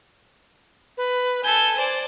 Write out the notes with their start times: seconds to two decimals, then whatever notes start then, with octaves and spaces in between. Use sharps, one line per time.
0.97 B4
1.44 A4 G#5 G6
1.76 C5 D5